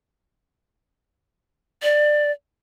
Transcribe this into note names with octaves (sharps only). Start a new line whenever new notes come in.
D5